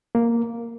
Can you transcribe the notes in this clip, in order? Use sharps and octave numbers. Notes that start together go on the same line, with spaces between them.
A#3